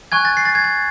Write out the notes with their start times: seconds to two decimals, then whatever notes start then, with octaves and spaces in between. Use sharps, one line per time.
0.12 G#5 C#6 F#6 G#6
0.25 A6
0.37 C7
0.45 A6
0.55 G#6
0.64 A6